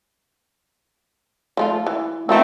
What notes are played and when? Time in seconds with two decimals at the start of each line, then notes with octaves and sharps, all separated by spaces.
1.57 F3 A3 F4
1.87 E3
2.29 F3 A3 B3 C4 D#4